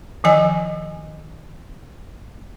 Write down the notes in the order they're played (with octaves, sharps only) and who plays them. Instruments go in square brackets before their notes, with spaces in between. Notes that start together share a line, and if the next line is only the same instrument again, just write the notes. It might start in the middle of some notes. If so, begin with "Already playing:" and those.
[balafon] D#3 F3 D#5 G#5